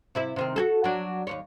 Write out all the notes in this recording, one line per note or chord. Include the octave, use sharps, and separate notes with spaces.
C3 E4 E5
C3 D#3 C4
F#4 G#4 A4
F#3 D4
D#2 G#2 C#5